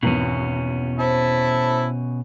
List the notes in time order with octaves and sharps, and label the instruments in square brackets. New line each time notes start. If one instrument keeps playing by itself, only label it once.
[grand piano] G#1 E2 [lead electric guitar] B2 C#4
[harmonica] E4 E5 A5 [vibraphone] C5